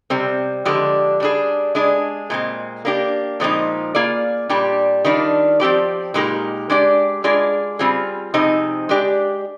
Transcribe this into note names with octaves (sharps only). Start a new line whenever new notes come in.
C3 G3 C4
D3 F3 G#3 D4 G4
G3 D4 G#4
G#3 D4 G#4
A#2 G#3 C4
A#3 D4 G4
A#2 F3 G#3 C4 D#4
A#3 F4 G#4 D5
A#2 G3 D4 G4
D#3 G3 D4 F4
F3 C4 G4 D5
A#2 G#3 D#4 G4 A#4
G#3 D4 G4 D5
G#3 D4 F4 G#4 D5
G3 C4 F4 G#4
C3 F3 C4 D#4 G#4
G#3 D4 G4 D5